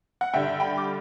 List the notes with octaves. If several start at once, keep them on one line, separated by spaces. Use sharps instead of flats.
F#5
G2 D3 G3 E5 G5
G5 B5
D6